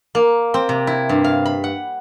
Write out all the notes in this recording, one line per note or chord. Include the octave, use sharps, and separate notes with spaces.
A#3
C4
C3
E4
G2
F5
B5
F#5